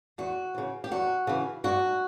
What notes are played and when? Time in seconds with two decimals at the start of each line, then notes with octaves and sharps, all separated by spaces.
0.18 E2 F#4
0.54 C#3 E3
0.84 G4
0.91 E2 F#4
1.27 C#3 E3
1.64 G2 F#4